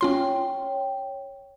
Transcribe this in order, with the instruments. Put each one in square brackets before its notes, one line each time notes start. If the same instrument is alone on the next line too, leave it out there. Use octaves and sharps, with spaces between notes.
[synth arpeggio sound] C#4 F4 C6 [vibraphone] C#5 G5